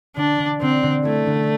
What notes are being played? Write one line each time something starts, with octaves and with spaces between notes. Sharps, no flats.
D3 D4
D3
D3 C4
D3
A3 E4
D3